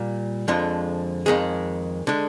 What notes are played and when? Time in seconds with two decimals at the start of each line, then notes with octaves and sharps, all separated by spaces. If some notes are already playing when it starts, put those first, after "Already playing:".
Already playing: A#2 G3
0.48 F2 D3 F3 G#3
1.26 F2 D#3 G#3 G#4
2.07 D3 G#3